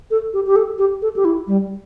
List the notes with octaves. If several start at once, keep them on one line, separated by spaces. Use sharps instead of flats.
A4
G4
G4
A4
G4
A4
G4
E4
G3